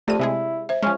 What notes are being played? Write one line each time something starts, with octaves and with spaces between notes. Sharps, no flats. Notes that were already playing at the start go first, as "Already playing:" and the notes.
F2 A3 G4 D5 A5 D#7
C3 G#3 E4 G#4
C5 E5
F3 G#3 C#4